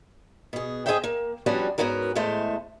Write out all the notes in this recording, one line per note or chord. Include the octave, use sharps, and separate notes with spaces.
B2 G#4
G#4 A4 C5 D#5 E5 G5
A#3
F3 G3 B3 C#4 D4 F#4
G#2 G3 B3 C#4 F#4 A#4
E2 A2 G#3 A3 C5